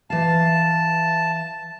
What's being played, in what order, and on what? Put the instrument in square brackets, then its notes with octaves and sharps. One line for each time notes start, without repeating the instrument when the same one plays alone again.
[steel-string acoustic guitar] E3 F5 [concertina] A5